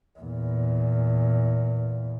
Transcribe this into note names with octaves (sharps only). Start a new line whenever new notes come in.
E2 A#2